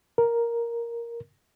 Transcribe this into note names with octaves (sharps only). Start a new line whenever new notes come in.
A#4